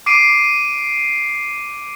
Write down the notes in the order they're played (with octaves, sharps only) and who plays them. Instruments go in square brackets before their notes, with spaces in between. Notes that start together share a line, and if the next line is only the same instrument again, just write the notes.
[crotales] D6 C7 D7 D#7